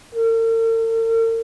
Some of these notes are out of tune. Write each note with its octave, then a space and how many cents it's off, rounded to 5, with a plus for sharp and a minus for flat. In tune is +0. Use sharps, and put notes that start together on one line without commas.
A#4 -45